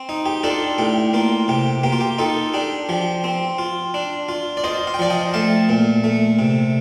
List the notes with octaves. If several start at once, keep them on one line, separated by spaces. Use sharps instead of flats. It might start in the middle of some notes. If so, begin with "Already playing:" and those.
Already playing: C4
D#4
G4
D4 F4 A4
A2 G4
A#3 F4
C3 G4
A#3 G4
F4
G4
D#4 F4 A4
D4 G4
F3 G4
C4
F4
D4
F4
D5
F4 C5 D#5
F5
G5
F3 D5 F5
D#5 G5
A3 F5 A5
A#2
A3
C3